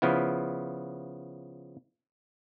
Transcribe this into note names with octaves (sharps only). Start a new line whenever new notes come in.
C#3 F3 B3 E4